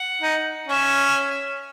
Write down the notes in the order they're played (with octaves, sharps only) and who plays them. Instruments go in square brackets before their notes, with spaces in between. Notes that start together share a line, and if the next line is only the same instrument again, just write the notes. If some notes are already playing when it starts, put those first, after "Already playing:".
Already playing: [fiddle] F#5
[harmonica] D#4
[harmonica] C#4 [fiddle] E5